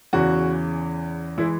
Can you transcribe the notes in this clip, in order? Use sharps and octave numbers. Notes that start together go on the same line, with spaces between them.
E2 C#3 E3 F#4
E3 G#3 E4